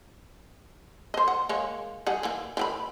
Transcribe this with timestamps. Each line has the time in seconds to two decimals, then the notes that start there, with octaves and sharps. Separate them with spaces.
1.14 C5 D#5
1.28 F#5
1.49 G#3 A#3 C#5
2.07 G3 G#4 F#5
2.23 E3 A#3
2.57 E3 G4 B5